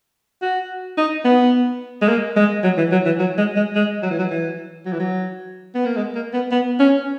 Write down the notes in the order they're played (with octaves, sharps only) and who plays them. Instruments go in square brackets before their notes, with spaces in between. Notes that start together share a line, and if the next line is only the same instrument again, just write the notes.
[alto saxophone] F#4
D#4
B3
G#3
A#3
G#3
F#3
E3
F#3
E3
F#3
G#3
G#3
G#3
F#3
E3
F#3
E3
F#3
E3
F#3
B3
A#3
G#3
A#3
B3
B3
C#4